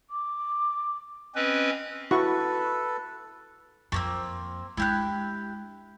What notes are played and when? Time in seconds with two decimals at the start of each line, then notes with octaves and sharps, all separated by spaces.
0.10 D6
1.35 C4 C#4 B4 D#5
2.11 E4 F#4 A4 B4 C#6
3.92 F2 A3 A#3 C4
4.77 G#3 D4 E4 G4 F#6